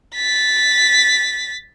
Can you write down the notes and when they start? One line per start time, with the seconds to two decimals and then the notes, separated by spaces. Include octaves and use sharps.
0.16 A6 B6